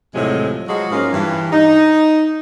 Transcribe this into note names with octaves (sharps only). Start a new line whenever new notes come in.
D#2 A2 C3 F3 F#3 G#3
F3 F#3 G#3 F4 F#4
G#2 A#3 C#4 F4
G2 E3
D#4